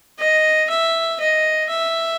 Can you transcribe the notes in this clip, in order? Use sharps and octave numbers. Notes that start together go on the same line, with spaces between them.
D#5
E5
D#5
E5